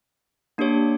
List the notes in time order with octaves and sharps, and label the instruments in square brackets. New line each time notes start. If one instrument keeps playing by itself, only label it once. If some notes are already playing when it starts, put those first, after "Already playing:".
[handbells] A#3 D4 G4 C#5